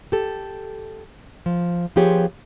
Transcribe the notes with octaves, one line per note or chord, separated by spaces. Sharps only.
G4 A4
F3
F3 B3 F4 G4 G#4 C#5